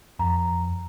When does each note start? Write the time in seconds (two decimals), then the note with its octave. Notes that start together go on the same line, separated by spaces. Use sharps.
0.19 F2 A#5